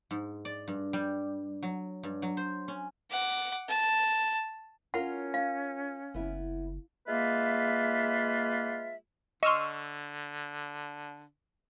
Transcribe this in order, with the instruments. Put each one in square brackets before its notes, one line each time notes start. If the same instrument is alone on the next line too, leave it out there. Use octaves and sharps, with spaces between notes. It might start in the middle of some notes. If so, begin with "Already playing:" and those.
[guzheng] G#2
D5
G2
G3
F#3
G2
F#3
C5
C#4
[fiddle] F#5 D6
A5
[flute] C#4 [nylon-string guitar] F4 A#4 C#5 [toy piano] F#5
[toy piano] F5
[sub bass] F#1 [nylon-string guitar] B3 E4
[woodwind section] G#3 A#3 F4 B4 E5
[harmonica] D3 [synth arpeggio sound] D#5 C6 [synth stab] C#6 E6 F6